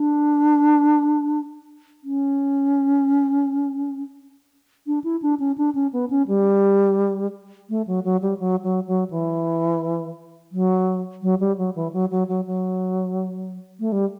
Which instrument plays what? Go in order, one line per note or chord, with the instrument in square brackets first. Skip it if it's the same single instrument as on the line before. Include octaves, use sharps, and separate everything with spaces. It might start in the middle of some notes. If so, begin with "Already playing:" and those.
Already playing: [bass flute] D4
C#4
D4
E4
D4
C#4
D4
C#4
B3
C#4
G3
A3
F#3
F#3
G3
F#3
F#3
F#3
E3
F#3
F#3
G3
F#3
E3
F#3
F#3
F#3
F#3
A3
G3